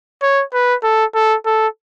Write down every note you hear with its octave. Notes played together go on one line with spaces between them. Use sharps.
C#5
B4
A4
A4
A4